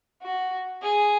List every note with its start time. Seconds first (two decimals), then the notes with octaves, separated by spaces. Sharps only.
0.22 F#4
0.82 G#4